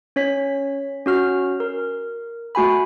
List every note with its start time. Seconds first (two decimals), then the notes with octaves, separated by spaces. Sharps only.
0.16 C#4 C#5 B6
1.06 C#4 F#4 F6
1.60 A#4
2.55 A3 F#4 G#5 B5